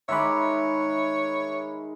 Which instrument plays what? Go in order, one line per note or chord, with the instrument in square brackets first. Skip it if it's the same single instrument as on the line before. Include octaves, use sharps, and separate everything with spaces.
[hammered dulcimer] D#3 G#3 D6 [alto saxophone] C#5 [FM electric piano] E5 B5